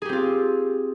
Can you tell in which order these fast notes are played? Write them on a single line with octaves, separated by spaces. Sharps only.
G#4 G4 C4 F4